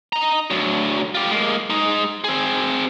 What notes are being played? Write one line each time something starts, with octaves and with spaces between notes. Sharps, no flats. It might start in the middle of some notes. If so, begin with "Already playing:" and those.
D#5 A#5
D2 F#3
F4 G4
G#3 A#3
G#3 D#4
C4 G#4